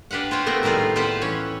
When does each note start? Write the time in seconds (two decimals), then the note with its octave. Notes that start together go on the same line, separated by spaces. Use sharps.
0.11 D4 G4 B4 F5 F#5
0.31 F4 C5 C#5 G5
0.46 C3 A3 B3 C4 A#4
0.63 A2 D#3 G3 F4 G#4
0.96 F4 G4 B4 C5 F#5
1.21 E3 C#4 C#5